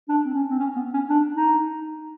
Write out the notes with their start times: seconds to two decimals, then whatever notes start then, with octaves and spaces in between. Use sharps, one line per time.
0.09 D4
0.25 C4
0.34 C#4
0.50 C4
0.59 C#4
0.76 B3
0.94 C#4
1.09 D4
1.36 D#4